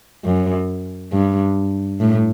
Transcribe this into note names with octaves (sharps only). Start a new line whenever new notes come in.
F#2
G2
A2